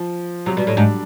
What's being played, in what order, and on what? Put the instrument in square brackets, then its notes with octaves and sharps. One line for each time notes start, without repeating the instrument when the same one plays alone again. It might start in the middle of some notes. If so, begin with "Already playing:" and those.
Already playing: [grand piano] F3
[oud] C3 [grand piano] F#3
[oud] B2 [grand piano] G3
[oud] A2
[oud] G#2 [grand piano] D4